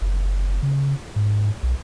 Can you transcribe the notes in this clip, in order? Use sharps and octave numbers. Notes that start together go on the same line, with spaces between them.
F#1
C#3
G#2
B1